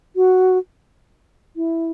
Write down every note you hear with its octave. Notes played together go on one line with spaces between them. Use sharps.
F#4
E4